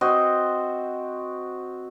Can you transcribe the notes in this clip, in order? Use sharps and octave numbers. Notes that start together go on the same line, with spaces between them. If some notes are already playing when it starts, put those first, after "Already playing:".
C4 F#4 C5 D#5